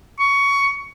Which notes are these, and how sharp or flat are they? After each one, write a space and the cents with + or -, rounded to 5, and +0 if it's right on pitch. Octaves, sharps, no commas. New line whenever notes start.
C#6 +15